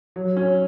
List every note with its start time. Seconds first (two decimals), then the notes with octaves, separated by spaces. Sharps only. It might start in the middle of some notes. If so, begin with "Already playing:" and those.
0.16 F#3
0.37 C#4